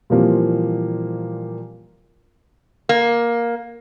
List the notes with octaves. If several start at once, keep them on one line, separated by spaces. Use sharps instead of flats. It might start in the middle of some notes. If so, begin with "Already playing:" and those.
A#2 E3 F3 G3 A#3 C4
A#3